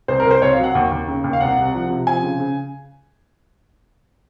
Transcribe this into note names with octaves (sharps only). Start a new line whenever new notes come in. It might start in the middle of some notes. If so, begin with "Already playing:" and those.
C2 C5
A#4
C2
C5
C2 C#5
F5
F#3
F#5
D#2
D#2
C#3
D#2
F5
C2 F#5
C3
F3
C3
F3 G#5
C#3
C#3